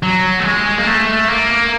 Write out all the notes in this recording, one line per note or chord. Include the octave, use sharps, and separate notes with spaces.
F#3
A3
G#3
A#3
A3
A#3